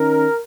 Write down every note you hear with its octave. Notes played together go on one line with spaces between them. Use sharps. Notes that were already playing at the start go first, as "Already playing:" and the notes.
Already playing: D#3 C#4 A#4